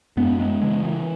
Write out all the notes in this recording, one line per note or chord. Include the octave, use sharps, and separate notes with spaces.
F#2 G#3 B3
G#3 B3
C#3 E3 G#3
E3